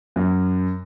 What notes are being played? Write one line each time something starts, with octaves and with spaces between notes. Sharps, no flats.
F#2